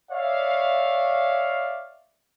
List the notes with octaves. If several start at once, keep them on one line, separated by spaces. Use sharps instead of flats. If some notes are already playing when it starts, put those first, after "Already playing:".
C#5 D5 E5 F5